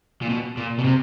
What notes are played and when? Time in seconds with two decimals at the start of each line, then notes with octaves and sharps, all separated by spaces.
0.22 A#2
0.30 B2
0.57 A#2
0.79 B2
0.84 C3